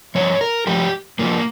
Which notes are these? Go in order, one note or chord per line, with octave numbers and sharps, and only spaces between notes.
G2 F3 C#5
A#4
G2 F3 G4
G2 F3 A#3